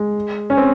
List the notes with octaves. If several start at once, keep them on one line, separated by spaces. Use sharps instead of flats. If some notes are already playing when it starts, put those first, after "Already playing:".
Already playing: G#3
C#4
C4